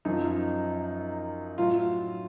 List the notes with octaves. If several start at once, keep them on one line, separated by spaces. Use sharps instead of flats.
F#2 F3 D#4
A2 F#3 F4